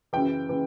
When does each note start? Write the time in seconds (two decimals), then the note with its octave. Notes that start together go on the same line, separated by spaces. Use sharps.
0.13 F#2 C#3 E3 G5
0.49 C#3 E3